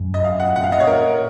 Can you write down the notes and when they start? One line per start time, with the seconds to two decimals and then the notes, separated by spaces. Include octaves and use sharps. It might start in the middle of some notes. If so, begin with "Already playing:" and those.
Already playing: F#2
0.14 D#5
0.24 F5
0.40 F#5
0.55 A#2 F#5
0.64 F5
0.72 D#5
0.80 C#5
0.87 A#4